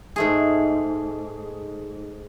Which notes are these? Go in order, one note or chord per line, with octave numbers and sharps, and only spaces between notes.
G#2 A3 G#4